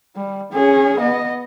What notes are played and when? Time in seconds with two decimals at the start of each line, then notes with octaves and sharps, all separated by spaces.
0.16 G3
0.53 C#4 G#4
1.00 B3 D#5